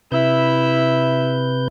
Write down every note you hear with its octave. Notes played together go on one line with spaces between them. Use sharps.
C3 E4 B4 E5 G6